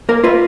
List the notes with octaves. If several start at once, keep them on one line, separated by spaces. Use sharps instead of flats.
A#3 A#4
F4 B4